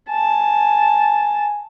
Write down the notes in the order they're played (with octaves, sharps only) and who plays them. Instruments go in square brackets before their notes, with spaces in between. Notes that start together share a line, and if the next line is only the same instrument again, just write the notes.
[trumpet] G#5 [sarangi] A5